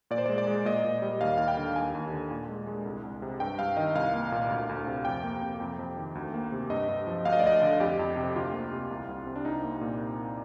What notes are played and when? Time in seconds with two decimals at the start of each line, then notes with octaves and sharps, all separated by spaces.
0.11 A#2 D5
0.18 C5
0.26 D5
0.29 G#3
0.38 D5
0.47 G#3
0.65 A#2 D#5
0.84 A#2
1.02 G3
1.21 D#2 F5
1.38 D#2 F5
1.48 G5
1.57 D3
1.76 D#2 G#5
1.95 D#2
2.13 D3
2.31 A#2
2.49 G#3
2.67 G#3
2.86 C2
3.04 C2
3.22 C3
3.40 G2 G5
3.59 G2 F5
3.77 D#3 D#5
3.95 C2 F5
4.14 A#3
4.32 A#2
4.50 D2
4.69 D2
4.87 C3
5.05 F2 G5
5.24 A#3
5.42 C3
5.60 F2 G5
5.79 F2
5.97 D#3
6.15 D2
6.34 A#3
6.52 C3
6.70 G2 D#5
6.88 G2
7.07 F3
7.25 D2 F5
7.33 D#5
7.40 D5
7.43 D2 D#5
7.62 D3
7.80 F2 G4
7.99 F2
8.16 C3
8.35 D2 F4
8.53 A#3
8.72 C3
8.91 C2
9.09 C2
9.26 C3
9.36 D4
9.45 C2 D#4
9.63 A#3
9.81 A#2